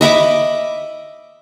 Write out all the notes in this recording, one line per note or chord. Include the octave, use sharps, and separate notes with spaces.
D#5 E5 B5 D6